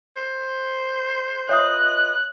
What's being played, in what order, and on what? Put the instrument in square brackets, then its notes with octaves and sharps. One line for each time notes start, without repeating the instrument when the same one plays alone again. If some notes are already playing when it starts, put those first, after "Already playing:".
[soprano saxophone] C5
[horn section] F4 B4 D#5 [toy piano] C#5 E5 D#6 [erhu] F#6